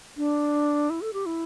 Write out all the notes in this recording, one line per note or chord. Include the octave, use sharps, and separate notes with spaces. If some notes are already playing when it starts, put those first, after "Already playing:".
D4
E4
A4
G4
E4